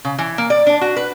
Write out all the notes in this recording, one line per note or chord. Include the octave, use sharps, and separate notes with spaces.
C#3
E3
A#3
D5
D4
F#4
B4